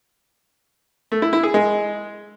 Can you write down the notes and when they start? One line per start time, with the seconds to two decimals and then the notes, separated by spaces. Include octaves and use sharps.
1.12 A3
1.22 E4
1.33 E4
1.43 G#4
1.54 G#3